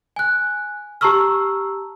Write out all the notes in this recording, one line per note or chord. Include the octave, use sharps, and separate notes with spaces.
G#5 F#6
G4 A5 A#5 C#6 E6 F6